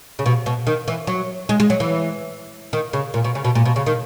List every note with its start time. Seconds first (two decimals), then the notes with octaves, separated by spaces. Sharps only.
0.19 C#3
0.26 B2
0.46 B2
0.67 D#3
0.88 E3
1.07 F#3
1.49 G#3
1.60 G#3
1.70 F#3
1.80 E3
2.73 D#3
2.93 C#3
3.14 A#2
3.24 B2
3.35 C#3
3.45 B2
3.55 A#2
3.65 B2
3.76 C#3
3.86 D#3